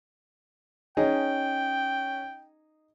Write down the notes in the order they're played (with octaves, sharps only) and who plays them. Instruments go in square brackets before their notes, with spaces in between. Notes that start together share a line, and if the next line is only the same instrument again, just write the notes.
[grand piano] C#4 [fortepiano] D#4 G#4 D#5 [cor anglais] G5